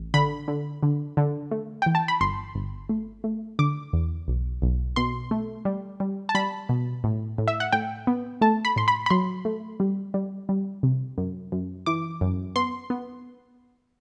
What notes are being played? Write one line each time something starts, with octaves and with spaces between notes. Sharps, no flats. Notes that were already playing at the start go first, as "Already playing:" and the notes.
Already playing: A1
D3 B5
D3
D3
D3
A3
E3 G5
A5
B5
G1 C6
G1
A3
A3
D3 D6
E2
B1
B1
B2 C6
A3
G3
G3
A5
G3 B5
B2
A2
A2
E5
F#5
A2 G5
B3
A3 A5
B5
A2 C6
B5
B5
F#3 C6
A3
G3
G3
G3
C3
F#2
F#2
E3 D6
F#2
B3 C6
B3